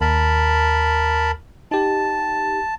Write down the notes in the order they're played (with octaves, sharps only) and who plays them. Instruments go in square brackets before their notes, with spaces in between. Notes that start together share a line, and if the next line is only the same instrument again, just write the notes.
[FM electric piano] D#2 [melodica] A#4 A5 B5
[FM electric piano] D#4 G4 [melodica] A5